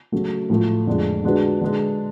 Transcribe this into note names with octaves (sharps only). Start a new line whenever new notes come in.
C#3 F#3 A3
A2 F3 A3
F2 D3 G#3 D4
D3 G#3 D4 F#4 B4
D3 G#3 D4